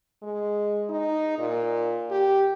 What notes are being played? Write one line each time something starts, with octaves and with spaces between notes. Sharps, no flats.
G#3
D#4
A#2
G4